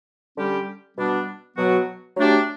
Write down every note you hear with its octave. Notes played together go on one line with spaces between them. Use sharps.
D3 G3 C#4 G4
B2 G3 B3 D4
B2 F#3 B3 F#4
F#3 A3 D4 G4